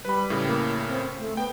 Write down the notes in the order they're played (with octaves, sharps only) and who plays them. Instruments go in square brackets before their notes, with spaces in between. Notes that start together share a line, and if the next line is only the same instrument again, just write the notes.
[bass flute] G3 [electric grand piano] B4 B5
[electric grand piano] A2 C#3
[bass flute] A#3
C4
A3
[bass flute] B3 [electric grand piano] G5